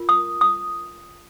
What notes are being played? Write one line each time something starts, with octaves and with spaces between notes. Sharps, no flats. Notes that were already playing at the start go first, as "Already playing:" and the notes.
Already playing: F4 A#4
D#6
D#6